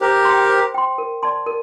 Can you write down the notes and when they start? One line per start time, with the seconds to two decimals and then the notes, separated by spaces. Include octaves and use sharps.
0.01 G4 A#4 C5
0.25 G5 C6
0.50 C5
0.74 G5 C6
0.98 A#4
1.23 D5 A5 C6
1.46 A#4